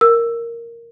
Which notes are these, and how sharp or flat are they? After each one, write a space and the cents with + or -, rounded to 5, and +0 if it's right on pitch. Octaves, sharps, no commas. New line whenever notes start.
A#4 -5 E6 +10